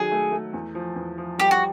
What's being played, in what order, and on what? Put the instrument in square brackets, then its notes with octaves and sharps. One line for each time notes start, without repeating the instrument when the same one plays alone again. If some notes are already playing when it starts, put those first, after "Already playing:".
Already playing: [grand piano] D#3 F#3 [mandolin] G#4
[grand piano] A3
A3
E2
F3
E2
F3
[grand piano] G3 [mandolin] G4
[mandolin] F#4